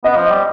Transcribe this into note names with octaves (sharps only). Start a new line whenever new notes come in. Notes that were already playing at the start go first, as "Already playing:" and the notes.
B3 D#5
F3
G3